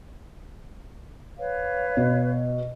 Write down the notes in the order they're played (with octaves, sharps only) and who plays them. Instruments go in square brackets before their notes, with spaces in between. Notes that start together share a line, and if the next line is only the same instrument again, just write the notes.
[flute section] B4 C#5 F5
[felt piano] B2